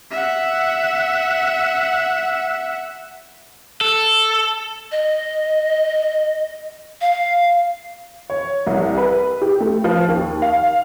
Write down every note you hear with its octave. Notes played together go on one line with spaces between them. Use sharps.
E5 F#5
A4
D#5
F5
C#5
C2
B4
G4
A3
F3
D#2
F5